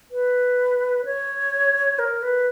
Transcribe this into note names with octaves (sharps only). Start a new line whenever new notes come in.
B4
C#5
A#4
B4